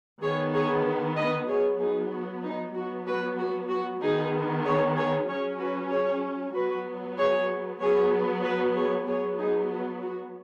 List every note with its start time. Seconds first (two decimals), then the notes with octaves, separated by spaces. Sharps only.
0.22 D#3 B3 G#4 C#5
0.54 G#4 C#5
1.17 B4 D#5
1.48 F#3 B3 G#4 C#5
1.80 D#4 G#4
2.11 F#4
2.43 D#4
2.74 F#3 B3 F#4
3.06 F#4 B4
3.38 F#4
3.69 F#4
4.01 D#3 B3 D#4 G#4
4.65 G#4 C#5
4.96 G#4 C#5
5.28 F#3 C#4 G#4 C#5
5.60 F#4 B4
5.90 G#4 C#5
6.54 F#3 B3 F#4 B4
7.18 G#4 C#5
7.81 F#3 B3 G#4 C#5
8.43 F#4 B4
8.75 G#4 C#5
9.06 F#3 B3 G#4 C#5
9.38 D#4 G#4
9.70 F#4
10.02 F#4